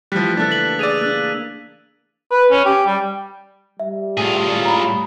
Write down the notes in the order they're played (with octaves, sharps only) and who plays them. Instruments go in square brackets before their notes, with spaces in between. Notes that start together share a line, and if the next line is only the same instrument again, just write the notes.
[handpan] E3 A3 G4 [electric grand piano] F3 G3 [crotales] F#6 B6
[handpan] C#3 A#3 [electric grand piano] D4 A4 [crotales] F#6 A6
[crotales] B6 F#7
[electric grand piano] G#4 D5 [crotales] E6 D#7 F7
[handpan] A#3 D4 [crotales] F#6
[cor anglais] B4
C#4
G4
G3
[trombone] G3 [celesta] E5
[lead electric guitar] A2 [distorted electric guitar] F4 G#4
[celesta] A#5 B5